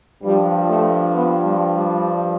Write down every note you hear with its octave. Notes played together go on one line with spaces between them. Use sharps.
G2 F3 G3
A3
B3
G3
G3